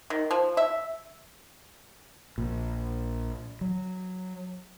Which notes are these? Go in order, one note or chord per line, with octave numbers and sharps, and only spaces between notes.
D#3
F3
E5
A#1 A#2
F#3